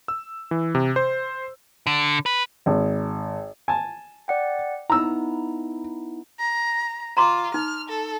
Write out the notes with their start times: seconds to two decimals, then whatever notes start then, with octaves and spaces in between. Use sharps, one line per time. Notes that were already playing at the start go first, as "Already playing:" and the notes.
0.08 E6
0.51 E3
0.75 C3
0.96 C5
1.87 D3
2.26 B4
2.66 G#1
3.68 G#5 A5
4.28 D5 F#5 G5
4.90 B3 D#4 E4 A#5 E6
6.39 A#5
7.17 F4 A#5 C6 D6
7.54 D#4 F6
7.89 A4